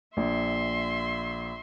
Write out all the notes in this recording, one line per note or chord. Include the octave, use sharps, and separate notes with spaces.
A#1 E5 C6